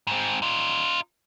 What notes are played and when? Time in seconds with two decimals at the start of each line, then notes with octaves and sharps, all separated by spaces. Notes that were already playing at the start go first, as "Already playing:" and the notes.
0.07 G#2 C4
0.42 D#4 F4